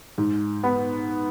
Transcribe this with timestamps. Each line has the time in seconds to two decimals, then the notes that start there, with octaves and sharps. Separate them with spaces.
0.18 G#2
0.64 B3